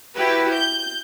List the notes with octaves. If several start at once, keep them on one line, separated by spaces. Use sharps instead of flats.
E4 F#4 G4 B4
G6